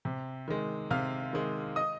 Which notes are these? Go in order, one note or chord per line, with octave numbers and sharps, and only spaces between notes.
C3
D#3 G#3
C3 F5 F6
D#3 G#3
D#5 D#6